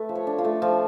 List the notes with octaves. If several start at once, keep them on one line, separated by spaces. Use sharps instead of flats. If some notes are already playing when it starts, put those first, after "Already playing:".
Already playing: A3 B4
F3
C#5
D4
F4
A3
F3